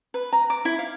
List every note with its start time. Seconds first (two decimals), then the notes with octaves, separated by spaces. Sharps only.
0.14 B4
0.33 A#5
0.50 D6
0.65 E4
0.79 F5